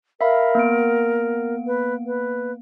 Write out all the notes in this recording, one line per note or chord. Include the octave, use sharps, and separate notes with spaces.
A#4 E5 F5 B5
A#3 B3 D7
B4
B4